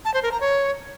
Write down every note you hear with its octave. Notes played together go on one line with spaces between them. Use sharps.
A5
C5
A#4
A#5
C#5